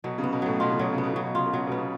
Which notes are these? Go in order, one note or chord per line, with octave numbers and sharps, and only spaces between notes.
B2 F#3
C#3
B3
B2
A2 F#3
B2 F4
C#3
B2 F#3
C#3
B3
B2
C#3 F#3
B2
C#3 F4
B2
C#3 F#3
B2 B3
C#3